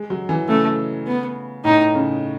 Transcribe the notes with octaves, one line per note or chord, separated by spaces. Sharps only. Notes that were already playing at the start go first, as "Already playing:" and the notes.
Already playing: G#3
F#3
E3
C#3 A3
B3
A2 D#4
C#3